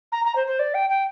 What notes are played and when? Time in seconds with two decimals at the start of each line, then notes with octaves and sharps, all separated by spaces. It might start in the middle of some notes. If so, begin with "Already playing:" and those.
0.12 A#5
0.25 A#5
0.36 C5
0.47 C5
0.59 D5
0.74 G5
0.90 G5